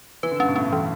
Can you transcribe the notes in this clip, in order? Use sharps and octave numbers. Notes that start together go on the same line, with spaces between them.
E3 B4
D3
G2 C#4
B2
A2 C#4
G2
E3